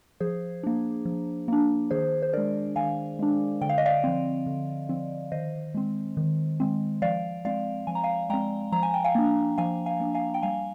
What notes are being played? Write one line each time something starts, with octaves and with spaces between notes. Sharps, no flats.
F3 G#4 C5
A#3 D4
F3
A#3 D4
D#3 G#4 C5
C5
G#3 D4 A#4 D5
D#3 F5 G#5
G#3 D4
D3 G5
F5
D#5
D5 F5
F3 C4
D3
F3 C4
D#3 C5 D#5
G#3 C4
D#3
G#3 C4
F3 D5 F5
G#3 C4 D5 F5
F3 G#5
A#5
F5 G#5
G#3 C4 G5 A#5
F3 A#5
G#5
G5
F5 G#5
A#3 D4
F3 F5 G#5
F5 G#5
A#3 D4
F5 G#5
G5
G3 F5 G#5